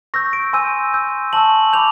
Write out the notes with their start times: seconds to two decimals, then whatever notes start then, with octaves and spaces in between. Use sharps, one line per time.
0.14 C#6 E6 G6 A#6
0.33 D7
0.53 G#5 C6 E6 G6 D#7
0.93 C6 E6 G6
1.33 A5 C#6 E6 F#7
1.73 B5 D6 G6 F7